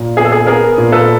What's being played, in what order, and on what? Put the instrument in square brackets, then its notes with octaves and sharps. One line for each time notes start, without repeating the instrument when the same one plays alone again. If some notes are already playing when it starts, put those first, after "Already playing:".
Already playing: [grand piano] A#2
B3 G#4
A4
G#4
B3 G#4 A#4
A#2
A4 B4